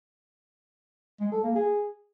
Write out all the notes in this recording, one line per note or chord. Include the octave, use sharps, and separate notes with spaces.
G#3
A4
A#3
G#4